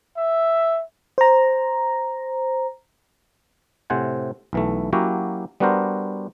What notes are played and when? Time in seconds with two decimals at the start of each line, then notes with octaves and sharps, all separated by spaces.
0.17 E5
1.18 C5 A#5
3.90 A2 C3 C5 F#5 G#5
4.53 B1 E3 A3
4.93 F#3 A#3 C#4 E4 F#4 G4
5.60 G3 B3 D4 F#4 A#4 C5